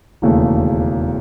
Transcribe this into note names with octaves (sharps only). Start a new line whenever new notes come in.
E1 D#2 C#3 E3 A3